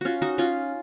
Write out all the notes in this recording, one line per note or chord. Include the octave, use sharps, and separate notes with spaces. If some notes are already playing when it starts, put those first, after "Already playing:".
C#4 F4 F#4
D#4 F#4
C#4 F4